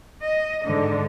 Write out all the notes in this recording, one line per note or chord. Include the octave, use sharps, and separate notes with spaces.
D#5
G#2 D3